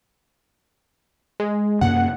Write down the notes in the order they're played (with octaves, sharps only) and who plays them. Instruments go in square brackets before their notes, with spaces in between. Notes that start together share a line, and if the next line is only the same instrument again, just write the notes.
[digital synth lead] G#3
[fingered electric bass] F#2 C3 A#3 [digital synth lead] F#5